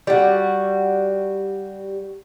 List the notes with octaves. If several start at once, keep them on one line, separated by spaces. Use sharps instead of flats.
G3 F#4